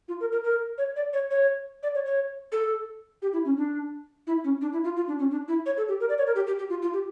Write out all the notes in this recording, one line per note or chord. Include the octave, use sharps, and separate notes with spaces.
F4
A#4
A#4
A#4
C#5
D5
C#5
C#5
D5
C#5
C#5
A4
G4
E4
C#4
D4
E4
C#4
D4
E4
F4
F4
D4
C#4
D4
E4
C#5
A4
G4
A#4
D5
C#5
A#4
G4
G4
G4
F4
F4
G4